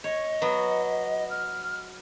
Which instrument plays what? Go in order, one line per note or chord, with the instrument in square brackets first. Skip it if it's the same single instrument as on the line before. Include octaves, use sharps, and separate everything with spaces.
[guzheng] C#5 [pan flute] D#5
[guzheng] F#3 B3
[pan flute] F6